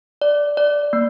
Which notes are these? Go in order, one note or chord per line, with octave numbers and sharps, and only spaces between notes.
D5
D5
A#3